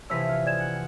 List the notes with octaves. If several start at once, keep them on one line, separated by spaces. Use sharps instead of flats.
C3 E3 F3 E4 C#5 E6 B6
F5
G#3 D5 G#6 E7
F#5